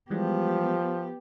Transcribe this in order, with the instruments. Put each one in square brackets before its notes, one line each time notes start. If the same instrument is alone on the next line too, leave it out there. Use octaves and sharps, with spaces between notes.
[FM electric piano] E3 G3 G#3 [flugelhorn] F3 [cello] B3 G4